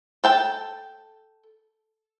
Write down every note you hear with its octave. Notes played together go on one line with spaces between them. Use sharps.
A4 G5 A5